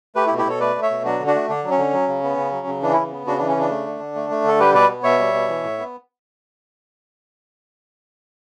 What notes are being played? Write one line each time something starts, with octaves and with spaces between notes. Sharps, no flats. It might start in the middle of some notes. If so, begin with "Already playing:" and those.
A3 G4 B4
E4 G4
B2
E4 G4
B2 A4 C#5
A3 B4 D5
A3
C#5 E5
B2
F#3 D4 F#4
D3
D4 F#4
A3
D3 D4
F#3
C#4
D3
F#3
C#3
B3
C#3
F#3
C#3
E3 D4
C#3 C#4 E4
B3
C#3 D4 F#4
E3 D4
C#4
C#3 D4
A3
D3
D3
A3
A3
D3 A4
G3 G4 B4
B2 B4 D5
B3
B2 C#5 E5
G3
B2
E3
A2
B3